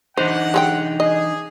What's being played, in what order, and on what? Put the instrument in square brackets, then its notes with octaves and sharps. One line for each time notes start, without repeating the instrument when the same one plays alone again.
[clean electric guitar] E3 D4 D#4 [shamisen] C5 [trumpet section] F#5
[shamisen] G#3 G#4 G5
[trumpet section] G#4 [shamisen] D#5